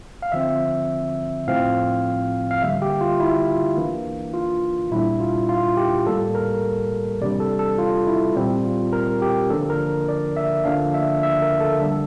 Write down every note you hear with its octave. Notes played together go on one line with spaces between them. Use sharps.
F5
D3 F3 C4 E5
A2 F3 C4 F5
F5
D3 G3 A#3 E5
G4
F4
E4
F4
E3 A#3 D4
F4
A#2 G3 D4 E4
F4
F4
G4
A2 G3 A#3 A4
A#4
C3 E3 G3 D4 D5
A4
A4
F4
E4
A#2 G3 C4
F4
A#4
G4
D3 F3 A#3 D4 A4
A#4
D5
E5
D3 F3 A#3 D4 F5
E5
E5
A#4
A4
D3 G3 D4 A4